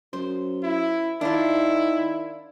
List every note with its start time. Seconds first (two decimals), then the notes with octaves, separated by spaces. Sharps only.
0.13 F#2 C5
0.63 E4
1.21 D#3 D4 E4 F4